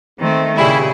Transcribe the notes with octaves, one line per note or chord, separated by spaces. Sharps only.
D#3 A3 C4
A#2 C#3 G3 E4 G#4